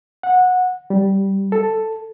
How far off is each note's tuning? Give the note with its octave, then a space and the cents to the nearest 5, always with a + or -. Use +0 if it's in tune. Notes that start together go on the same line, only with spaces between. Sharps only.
F#5 -15
G3 -10
A4 +5